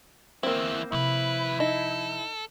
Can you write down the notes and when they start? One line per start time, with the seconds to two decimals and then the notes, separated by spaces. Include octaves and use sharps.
0.43 E2 A#3 C4 E4
0.92 D#2 C3 F3 E4 B4
1.60 D#4 A4